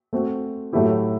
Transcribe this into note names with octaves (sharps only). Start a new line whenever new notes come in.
A3 C4 F#4
A2 F#3 A3 E4 G4